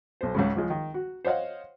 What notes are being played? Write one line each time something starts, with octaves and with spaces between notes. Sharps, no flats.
B1 C5
C#2 G#2 C#3
C#2 F3 G#3
D#3
F#4
C5 C#5 D#5 F5 F#5